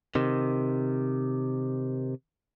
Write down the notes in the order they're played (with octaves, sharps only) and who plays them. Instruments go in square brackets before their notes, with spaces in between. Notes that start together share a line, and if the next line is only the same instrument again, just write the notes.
[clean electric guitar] C3 D#3